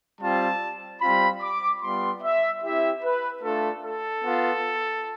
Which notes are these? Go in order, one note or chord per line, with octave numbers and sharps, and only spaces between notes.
G3 C4 F4 A5
G3 C4 F4 B5
D6
G3 B3 F4 C6
E5
C4 E4 G4 E5
B4
A3 D4 F4 A4
A4
B3 F4